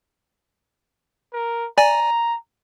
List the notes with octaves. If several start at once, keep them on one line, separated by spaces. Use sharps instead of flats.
A#4
D5 G#5 A#5